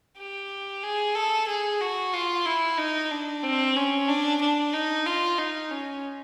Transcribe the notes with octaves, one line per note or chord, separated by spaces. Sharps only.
G4
G#4
A4
G#4
F#4
F4
E4
D#4
D4
C4
C#4
D4
D4
D#4
F4
D#4
C#4